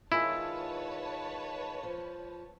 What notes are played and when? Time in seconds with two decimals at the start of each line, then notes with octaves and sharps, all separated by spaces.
0.12 D#3 G#3 E4 F4 B4 C#5 A5
1.83 F3